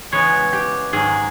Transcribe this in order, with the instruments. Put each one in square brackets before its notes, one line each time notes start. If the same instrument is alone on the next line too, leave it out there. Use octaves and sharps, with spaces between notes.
[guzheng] C#3 E3 G#3 B3 C#5
G4
G#2 D#3 F#3 G#4